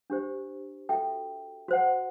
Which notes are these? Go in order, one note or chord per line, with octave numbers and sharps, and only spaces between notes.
D4 G4 C5
F#4 A4 E5 G5
F#4 C5 F#5